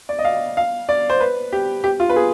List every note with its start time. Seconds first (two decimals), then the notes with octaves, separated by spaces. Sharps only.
0.09 D5
0.19 D#5
0.25 F5
0.57 F5
0.89 D5
1.10 C5
1.20 B4
1.53 G4
1.84 G4
2.00 F4
2.10 B4
2.16 G#4